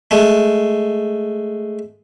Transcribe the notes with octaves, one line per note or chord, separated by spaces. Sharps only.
G#3 A3